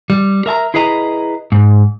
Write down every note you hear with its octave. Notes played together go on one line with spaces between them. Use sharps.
G3
A#4 E5 A5 A#5
E4 G#4 B4 D#5 A#5
G#2